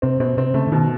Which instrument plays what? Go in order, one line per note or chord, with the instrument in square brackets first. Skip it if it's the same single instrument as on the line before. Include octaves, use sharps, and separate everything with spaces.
[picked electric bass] C3 [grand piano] C4
[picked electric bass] B2 [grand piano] C4
[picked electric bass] C3 [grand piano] C4
[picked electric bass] C#3 [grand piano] A3
[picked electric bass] D3
[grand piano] B2 [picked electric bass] D#3